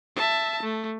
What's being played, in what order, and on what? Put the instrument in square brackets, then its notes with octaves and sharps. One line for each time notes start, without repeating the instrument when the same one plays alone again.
[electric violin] E5 A5
A3